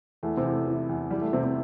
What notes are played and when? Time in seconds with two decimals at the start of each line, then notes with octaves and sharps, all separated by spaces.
0.23 E2 A3
0.37 C3 C4
0.44 E2
0.52 A3
0.66 E3
0.89 E2
1.11 E2 G3
1.21 A3
1.33 C3 E3 C4
1.43 C3 C4